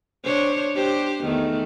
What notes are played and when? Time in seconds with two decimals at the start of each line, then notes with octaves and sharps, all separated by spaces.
0.24 D4 C5 C#5
0.75 D4 G4 C5
1.24 E2 D#3 A3